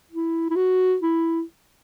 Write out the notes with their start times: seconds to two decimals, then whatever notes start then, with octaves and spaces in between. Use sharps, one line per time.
0.11 E4
0.50 E4
0.56 F#4
1.01 E4